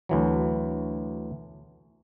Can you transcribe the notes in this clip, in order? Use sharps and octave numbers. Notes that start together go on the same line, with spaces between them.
D2 E3 F#3